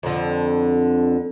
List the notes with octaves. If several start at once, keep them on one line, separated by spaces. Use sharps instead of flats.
F2 D3